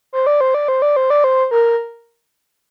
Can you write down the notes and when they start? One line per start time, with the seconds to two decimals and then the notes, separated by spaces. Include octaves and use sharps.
0.13 C5
0.27 D5
0.41 C5
0.54 D5
0.68 C5
0.82 D5
0.96 C5
1.10 D5
1.24 C5
1.51 A#4